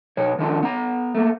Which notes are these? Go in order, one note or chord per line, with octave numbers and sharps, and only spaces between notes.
B2 C#5
D#3 F3 D4
B3 A#5
A3 A#3